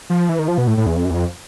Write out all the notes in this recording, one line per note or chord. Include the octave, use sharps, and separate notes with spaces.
F3
E3
D#3
F3
B2
A2
A2
E2
F2
F#2
E2
F2